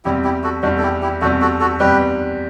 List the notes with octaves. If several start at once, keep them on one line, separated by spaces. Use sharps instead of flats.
E2 C3 G3 E4 G4
E4 G4
F#4 A4
E2 C3 G3 D4 F#4
A4
E4 G4
E4 G4
E2 C3 G3 F#4 A4
F#4 A4
F#4 A4
E2 C3 G3 G4 B4